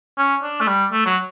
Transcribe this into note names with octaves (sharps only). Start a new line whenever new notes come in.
C#4
D4
A3
G3
A3
F#3